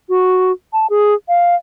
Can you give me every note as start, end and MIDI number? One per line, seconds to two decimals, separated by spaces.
0.09 0.52 66
0.73 0.87 81
0.90 1.14 68
1.28 1.55 77